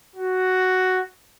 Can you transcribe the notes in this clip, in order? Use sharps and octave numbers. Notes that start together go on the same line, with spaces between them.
F#4